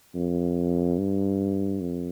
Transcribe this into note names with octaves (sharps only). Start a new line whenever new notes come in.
F2
G2
F2